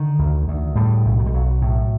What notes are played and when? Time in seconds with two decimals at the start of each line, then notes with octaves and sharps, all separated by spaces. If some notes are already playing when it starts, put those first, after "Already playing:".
Already playing: D3 D#3
0.19 D2
0.48 D2
0.75 A2 G3
1.05 B1
1.19 F#3
1.26 G3
1.34 B1 F#3
1.62 A2